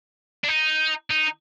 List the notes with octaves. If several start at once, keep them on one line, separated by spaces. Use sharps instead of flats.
D4
D#4
D#4